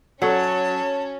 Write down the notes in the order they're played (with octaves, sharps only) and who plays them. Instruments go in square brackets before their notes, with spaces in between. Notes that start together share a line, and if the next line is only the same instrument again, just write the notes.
[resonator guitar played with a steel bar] F#3 [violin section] C#4 [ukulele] A4 C#5 F#5 [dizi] A5